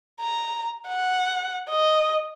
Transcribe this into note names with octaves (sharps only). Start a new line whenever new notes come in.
A#5
F#5
D#5